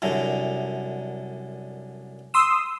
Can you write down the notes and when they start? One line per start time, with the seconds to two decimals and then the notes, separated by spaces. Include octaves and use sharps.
0.02 C2 F#2 D3
2.34 C6 D#6 E6